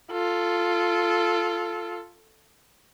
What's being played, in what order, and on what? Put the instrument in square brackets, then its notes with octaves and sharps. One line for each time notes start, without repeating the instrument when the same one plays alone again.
[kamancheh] F4 A4